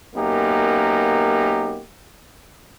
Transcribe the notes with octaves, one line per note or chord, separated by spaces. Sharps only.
F#2 A#3 B3 D#4 G4